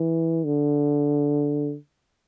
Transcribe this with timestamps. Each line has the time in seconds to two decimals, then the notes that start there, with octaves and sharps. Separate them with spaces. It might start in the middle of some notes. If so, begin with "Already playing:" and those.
Already playing: E3
0.45 D3